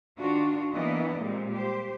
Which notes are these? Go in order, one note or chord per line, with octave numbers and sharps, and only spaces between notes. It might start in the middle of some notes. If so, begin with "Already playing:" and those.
D#3 D4 F4 F#4
E3 A#3 B3 D4 D5 D#5
A#2 G3 G#3 C4
G4 C5